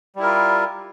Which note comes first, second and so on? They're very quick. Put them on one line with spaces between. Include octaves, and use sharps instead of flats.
G3 E4 A#4 F4